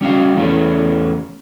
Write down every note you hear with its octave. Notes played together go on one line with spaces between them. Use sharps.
G3 C#4 F#4 F5
E2 E3 G3 A3 C#4